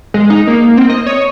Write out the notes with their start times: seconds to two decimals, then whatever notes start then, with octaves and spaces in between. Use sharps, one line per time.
0.14 G#3
0.30 D#4
0.47 A#3
0.77 C4
0.90 D#5
1.07 C#5